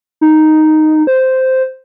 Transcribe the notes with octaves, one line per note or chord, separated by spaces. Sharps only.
D#4
C5